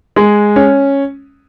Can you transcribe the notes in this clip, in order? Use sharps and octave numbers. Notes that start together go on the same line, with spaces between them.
G#3
C#4